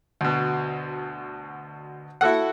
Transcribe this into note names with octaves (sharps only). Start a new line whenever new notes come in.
D2 B2
E4 F#4 A4 F#5